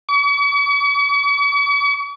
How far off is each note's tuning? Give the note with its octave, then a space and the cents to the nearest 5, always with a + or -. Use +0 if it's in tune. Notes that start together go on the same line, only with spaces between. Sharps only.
C#6 +45